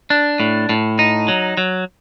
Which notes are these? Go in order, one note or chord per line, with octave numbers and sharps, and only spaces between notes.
D4
A2
A2
D#4
F#3
F#3